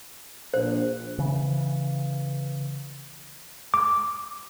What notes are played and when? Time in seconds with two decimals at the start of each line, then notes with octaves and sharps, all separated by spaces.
0.54 A#1 C5
1.18 C#3 E3
3.74 D6